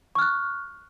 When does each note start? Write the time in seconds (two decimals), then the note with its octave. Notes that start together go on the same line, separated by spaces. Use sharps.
0.15 C#6
0.18 F6
0.22 F#6